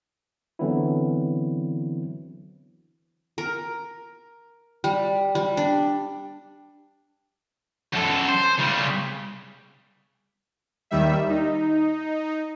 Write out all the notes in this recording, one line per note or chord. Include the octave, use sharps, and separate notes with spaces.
D3 E3 F#3 B3 C4 E4
A#4
G3
G3
D4
F#2 A4
C5
C#3 G3
D#2 D#3 G3 E5
D#4